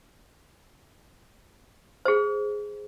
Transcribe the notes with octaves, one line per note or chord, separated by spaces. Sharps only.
G#4 C5